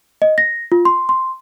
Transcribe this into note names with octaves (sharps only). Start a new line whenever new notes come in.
D#5
A#6
F4
C6
C6